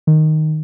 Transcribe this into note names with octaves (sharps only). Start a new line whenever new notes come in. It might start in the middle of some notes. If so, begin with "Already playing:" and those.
D#3